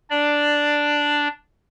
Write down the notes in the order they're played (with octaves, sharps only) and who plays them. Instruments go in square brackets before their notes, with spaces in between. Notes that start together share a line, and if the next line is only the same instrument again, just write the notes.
[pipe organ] D4 D5